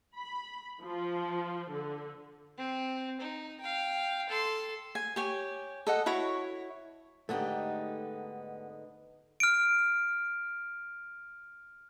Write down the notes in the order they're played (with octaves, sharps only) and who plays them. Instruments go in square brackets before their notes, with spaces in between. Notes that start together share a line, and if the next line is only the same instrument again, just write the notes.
[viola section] B5
F3
D3
[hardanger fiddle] C4
D#4
F5 G5
A4 C6
[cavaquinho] G#5
G4 C#5 G#5
A4 D#5 F#5
E4 F#4 C#5
[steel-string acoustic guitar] G#2 D3 D#4 [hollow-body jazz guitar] A3 B3 G4
[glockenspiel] F6 D7